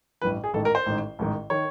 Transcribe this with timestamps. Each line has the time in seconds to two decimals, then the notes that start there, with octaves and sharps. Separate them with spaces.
0.22 A1 G2 E3 B4
0.44 G#4
0.53 A1 G#2 D#3 A4
0.65 A#4
0.75 C5
0.86 A1 G#2 D#3
1.19 A1 G#2 D#3
1.50 D#3 C#5